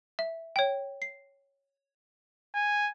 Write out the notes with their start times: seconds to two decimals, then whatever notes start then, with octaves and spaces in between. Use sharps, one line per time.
0.19 E5
0.56 C#5 G5
1.02 C7
2.54 G#5